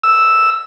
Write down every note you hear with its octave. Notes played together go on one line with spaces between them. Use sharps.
E6